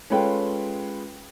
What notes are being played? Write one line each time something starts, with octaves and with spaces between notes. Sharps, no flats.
G#3 C#4 F4 A4 B4 G5